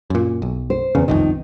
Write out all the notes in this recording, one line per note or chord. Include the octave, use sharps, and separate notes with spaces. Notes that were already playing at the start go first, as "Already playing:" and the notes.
F#2 A#2
B1
C5
E2 C#3
F1 C2 F2 D#3